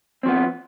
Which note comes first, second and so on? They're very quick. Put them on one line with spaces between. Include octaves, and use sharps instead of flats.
C4 F3 B3